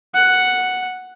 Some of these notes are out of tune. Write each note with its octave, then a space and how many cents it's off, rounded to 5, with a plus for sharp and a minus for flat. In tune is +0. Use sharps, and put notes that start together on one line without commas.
F#5 +0